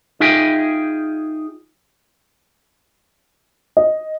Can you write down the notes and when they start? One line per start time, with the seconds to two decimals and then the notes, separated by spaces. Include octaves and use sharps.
0.20 D#4 F4 G#4 E5 G5 G#5
3.77 D#5